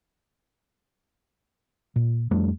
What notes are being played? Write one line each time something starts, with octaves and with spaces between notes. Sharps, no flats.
A#2
F2 G3 A3 D4